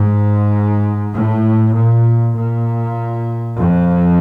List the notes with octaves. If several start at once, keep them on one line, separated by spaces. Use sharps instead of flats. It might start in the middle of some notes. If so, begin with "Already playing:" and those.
Already playing: G#2
A2
A#2
A#2
F2